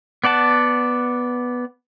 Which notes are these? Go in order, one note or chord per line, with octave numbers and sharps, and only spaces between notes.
B3 D5 F#5 A5